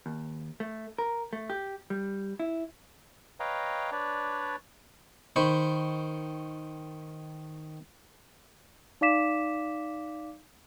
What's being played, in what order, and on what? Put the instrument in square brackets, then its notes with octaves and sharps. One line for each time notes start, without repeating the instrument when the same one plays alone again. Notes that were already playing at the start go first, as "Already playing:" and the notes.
[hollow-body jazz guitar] D#2
A3
A#4
A3
G4
G3
E4
[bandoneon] B4 C#5 D#5 F5 G5 A#5
D4 B4 C#5 D5
[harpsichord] D#3 C5 B5 C#6
[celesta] D#4 D5 F5 D6 B6 E7